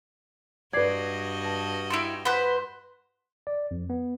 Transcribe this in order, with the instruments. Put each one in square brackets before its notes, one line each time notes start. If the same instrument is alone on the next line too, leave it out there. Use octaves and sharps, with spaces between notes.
[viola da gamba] G2 F#4 D#5 [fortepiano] B4 D5 [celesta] G#6 C7
[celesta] A5
[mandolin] E4 G5 C#6 [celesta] C6 E7 F7
[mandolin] B4 C5 [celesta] F#5
[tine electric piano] D5
F2
B3